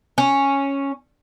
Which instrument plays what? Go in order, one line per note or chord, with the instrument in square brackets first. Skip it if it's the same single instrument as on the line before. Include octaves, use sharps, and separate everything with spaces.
[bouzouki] C#4